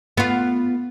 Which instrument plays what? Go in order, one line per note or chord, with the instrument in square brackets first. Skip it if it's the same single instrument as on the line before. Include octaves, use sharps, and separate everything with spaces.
[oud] B3 F4